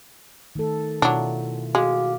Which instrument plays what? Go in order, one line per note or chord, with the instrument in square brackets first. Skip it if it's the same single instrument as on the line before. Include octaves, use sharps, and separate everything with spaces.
[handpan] D#3 A3 A4
[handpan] B2 E4 F4 [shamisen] F#3 D4
[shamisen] G#3 [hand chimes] F#4 F5 D6